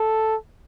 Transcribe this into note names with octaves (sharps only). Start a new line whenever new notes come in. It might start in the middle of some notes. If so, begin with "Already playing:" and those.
Already playing: A4